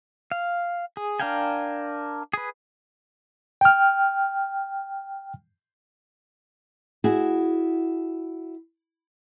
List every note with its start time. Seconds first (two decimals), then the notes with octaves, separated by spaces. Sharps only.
0.32 F5
0.97 G#4
1.20 D4 A#4 F5 G5 G#5
2.33 G#4 B4
3.61 G5 F6
7.04 E4 F#4 G#4 G#5